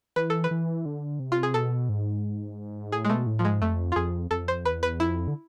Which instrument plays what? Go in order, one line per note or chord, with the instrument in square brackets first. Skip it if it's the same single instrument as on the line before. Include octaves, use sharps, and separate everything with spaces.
[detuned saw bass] E3 [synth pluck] B4
[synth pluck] A4
B4
[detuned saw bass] E3
D3
C3
[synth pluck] F4
G#4
[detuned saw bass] B2 [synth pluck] A4
[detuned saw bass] G#2
[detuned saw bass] A2 [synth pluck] G#4
[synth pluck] G#3
[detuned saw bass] B2 [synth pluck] A3
[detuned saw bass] A2
[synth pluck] F3
[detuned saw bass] G#2 [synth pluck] G#3
[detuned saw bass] F2 [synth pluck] A3
[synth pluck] F4
[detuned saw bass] F2 [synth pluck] G#4
[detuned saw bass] F2 [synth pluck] A4
[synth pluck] C5
[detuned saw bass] E2 [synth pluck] B4
[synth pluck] B4
[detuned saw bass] F2 [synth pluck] E4
[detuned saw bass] D3